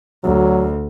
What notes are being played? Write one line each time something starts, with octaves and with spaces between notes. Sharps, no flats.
D2 F#3